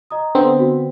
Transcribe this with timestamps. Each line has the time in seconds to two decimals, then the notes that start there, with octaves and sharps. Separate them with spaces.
0.10 D#5 A#5 D#6
0.35 D3 B3 C4
0.59 F#4